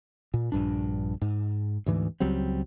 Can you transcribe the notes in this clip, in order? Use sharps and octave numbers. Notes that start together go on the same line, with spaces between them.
A#2
A#1 G2 D4
G#2
D2 G#2 E3
C#2 F#3 G3 C4